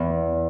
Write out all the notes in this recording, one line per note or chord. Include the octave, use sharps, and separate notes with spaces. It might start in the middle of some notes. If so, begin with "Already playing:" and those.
Already playing: E2